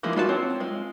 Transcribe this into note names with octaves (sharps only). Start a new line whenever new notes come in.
E3 F3 G#3 A#3
A3 F4 F#4 A4 A5
C4 C#5
G#3 F4